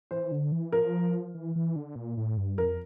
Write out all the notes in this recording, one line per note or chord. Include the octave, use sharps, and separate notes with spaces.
E3 C5
D3
E3
F3 A#4
E3
E3
D3
A#2
A2
G2
F2 A#4